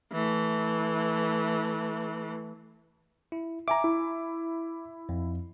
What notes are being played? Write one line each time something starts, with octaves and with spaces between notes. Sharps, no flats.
E3 A3
E4
E5 G#5 A#5 D6
E4
F2